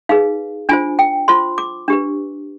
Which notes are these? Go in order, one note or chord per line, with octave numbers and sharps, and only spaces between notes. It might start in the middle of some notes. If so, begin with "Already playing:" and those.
D#4 G#4 B4 F5
D4 F4 C5 G#5
G5
F4 C5 C6
D6
D4 G4 B4